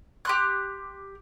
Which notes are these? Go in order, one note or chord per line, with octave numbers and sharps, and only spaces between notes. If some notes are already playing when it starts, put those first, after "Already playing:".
G4 C6 F#6